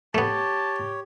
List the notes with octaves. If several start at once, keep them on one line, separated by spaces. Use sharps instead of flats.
A3 B3 G4 C#5 A5